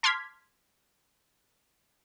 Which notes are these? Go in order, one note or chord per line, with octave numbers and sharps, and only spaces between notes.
A5 C6 D6 F6 G#6 B6